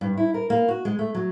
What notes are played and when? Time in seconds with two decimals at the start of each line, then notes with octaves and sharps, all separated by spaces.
0.01 G2
0.17 E4
0.34 A#4
0.50 A#3
0.68 F#4
0.85 G#3
0.99 A3
1.15 F#3